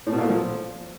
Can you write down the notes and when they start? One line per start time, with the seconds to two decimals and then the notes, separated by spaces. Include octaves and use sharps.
0.07 A2
0.12 B2
0.18 A#2
0.24 A3
0.30 F3